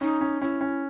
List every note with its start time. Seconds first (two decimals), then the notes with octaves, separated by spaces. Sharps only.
0.01 C#4 D#4
0.21 C#4
0.42 C#4 E4
0.61 C#4